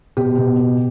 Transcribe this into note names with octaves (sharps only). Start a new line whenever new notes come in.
B2 G4
B2
B2